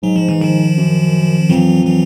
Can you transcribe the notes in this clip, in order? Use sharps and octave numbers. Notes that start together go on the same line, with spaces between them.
G#2 F#3
F3
E3
D#3 F3
F#2
F2 E3 F#3
E3 F#3